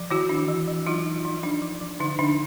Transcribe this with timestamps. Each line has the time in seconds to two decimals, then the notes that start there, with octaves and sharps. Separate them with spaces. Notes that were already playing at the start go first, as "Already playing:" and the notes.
Already playing: F3
0.11 D#3 E4 F#4
0.29 D4
0.48 E3
0.68 E3
0.86 F#3 D#4 F4
1.06 F#3
1.25 F3 D#4
1.43 F3 D4
1.62 F3
1.81 F3
2.00 D3 D#4
2.19 D3 D4